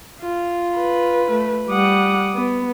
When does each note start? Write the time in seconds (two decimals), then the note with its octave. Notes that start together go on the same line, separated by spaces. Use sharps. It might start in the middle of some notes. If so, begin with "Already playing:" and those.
0.20 F4 F5
0.78 B4
1.30 A3
1.69 G3 F#5 D6 D#6
2.35 B3